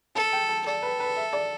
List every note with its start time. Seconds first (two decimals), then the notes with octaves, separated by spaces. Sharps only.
0.15 A4 A5
0.32 G5
0.49 A5
0.66 A4 D5
0.82 B4
1.00 B4
1.17 E5
1.33 D5